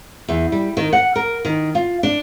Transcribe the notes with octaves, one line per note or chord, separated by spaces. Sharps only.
E2
G3
D#3
F#5
A#4
D#3
F4
D4